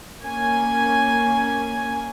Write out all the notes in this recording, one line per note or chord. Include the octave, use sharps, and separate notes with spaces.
A#3 C#4 G#5